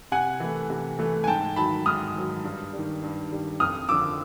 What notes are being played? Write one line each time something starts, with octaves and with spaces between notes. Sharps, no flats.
C3 F#5 G#5
E3 A3
C3
E3 A3
G#5
G#2 G5 A5
D#3 F#3 A5 B5
G#2 D#6 F6
D#3 F#3
G2
D#3 G3
G2
D#3 G3
F2 D#6 F6
D3 F3 D6 E6